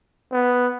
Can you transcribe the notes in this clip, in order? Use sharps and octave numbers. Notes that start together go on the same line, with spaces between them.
B3